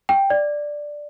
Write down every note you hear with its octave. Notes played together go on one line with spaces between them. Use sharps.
G5
D5